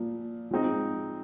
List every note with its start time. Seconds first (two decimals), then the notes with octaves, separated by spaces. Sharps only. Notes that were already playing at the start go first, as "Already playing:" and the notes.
Already playing: A#2 F3 A#3
0.51 F3 G#3 C4 D#4